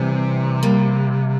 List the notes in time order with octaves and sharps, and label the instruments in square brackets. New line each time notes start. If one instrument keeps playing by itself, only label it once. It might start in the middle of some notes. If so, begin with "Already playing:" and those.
Already playing: [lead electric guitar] C3 [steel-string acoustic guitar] E3 G3
[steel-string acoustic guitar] G3 A#3